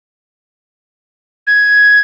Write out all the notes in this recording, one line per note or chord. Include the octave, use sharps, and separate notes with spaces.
G#6